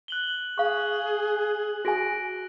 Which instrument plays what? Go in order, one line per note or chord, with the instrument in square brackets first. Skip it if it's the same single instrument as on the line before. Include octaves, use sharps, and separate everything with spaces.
[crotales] F#6 F#7 G7
[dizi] G#4 [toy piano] F5 C#6
[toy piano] F#4 G#4 G#5 [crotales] A#6 D7